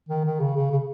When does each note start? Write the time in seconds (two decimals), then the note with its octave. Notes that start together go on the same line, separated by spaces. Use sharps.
0.09 D#3
0.25 D#3
0.40 C#3
0.56 C#3
0.71 C#3